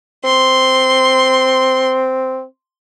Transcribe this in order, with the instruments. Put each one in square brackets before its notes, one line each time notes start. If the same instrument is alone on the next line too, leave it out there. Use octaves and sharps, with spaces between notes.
[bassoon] C4 [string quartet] C6